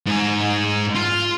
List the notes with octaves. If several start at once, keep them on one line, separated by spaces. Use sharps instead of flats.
G#2 G#5
F4